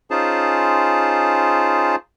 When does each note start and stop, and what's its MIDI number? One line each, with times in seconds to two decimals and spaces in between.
0.11 1.96 61
0.11 1.96 63
0.11 1.96 65
0.11 1.96 68
0.11 1.96 72
0.11 1.96 81